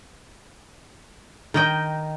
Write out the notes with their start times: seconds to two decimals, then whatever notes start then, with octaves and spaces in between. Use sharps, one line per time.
1.54 D#3 D#5 G5